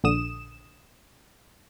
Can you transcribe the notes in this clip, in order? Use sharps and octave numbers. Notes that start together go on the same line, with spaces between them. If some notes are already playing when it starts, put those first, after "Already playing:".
A#1 D3 D#6 E7